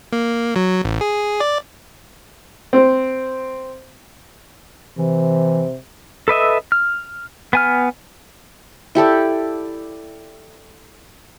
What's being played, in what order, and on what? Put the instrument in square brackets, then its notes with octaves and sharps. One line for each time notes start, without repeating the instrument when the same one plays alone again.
[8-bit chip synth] A#3
F#3
A1
G#4
D5
[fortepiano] C4
[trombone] C3 [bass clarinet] E3
[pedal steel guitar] A4 B4 D#5 E5
F6
B3 G#5 F6
[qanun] E4 G4 A4 D5